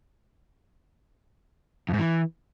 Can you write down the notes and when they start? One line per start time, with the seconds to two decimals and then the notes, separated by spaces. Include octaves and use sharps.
1.89 F2
1.94 G#2
1.99 E3